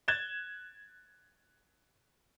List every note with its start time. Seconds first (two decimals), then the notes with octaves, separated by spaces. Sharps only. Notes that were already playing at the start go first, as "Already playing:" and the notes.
0.08 F#6 G#6 A6 E7 G7